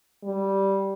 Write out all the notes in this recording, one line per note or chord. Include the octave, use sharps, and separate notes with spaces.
G3